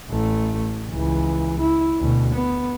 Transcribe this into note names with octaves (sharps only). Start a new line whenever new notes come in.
A1 A3
C#2 E3
E4
D2 B2
B3